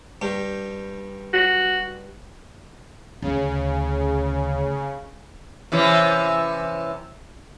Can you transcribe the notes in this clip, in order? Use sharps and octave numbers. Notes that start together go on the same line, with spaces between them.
G2 G3
F#4
D2 C#3
C3 E3 C#4